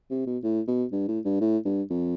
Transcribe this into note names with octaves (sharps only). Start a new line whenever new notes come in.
C3
B2
A2
B2
G2
A2
G2
A2
G2
F2